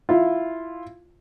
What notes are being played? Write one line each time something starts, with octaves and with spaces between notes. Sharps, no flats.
E4 F4